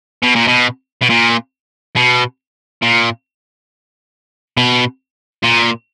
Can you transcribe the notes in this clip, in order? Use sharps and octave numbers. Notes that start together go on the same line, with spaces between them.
B2
A#2
B2
B2
A#2
B2
A#2
B2
A#2